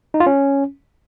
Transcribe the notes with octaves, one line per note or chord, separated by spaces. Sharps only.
D#4
F4
C#4